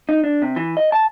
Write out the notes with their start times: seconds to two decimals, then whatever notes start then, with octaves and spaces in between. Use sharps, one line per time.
0.09 D#4
0.24 D4
0.42 C3
0.56 E3
0.77 D#5
0.92 A5